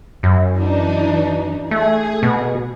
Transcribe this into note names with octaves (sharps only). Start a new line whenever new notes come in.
F#2
E3 D4 D#4
A3 G#4
B2